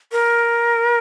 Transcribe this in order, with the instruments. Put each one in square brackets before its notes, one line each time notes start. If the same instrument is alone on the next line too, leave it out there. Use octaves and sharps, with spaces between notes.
[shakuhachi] A#4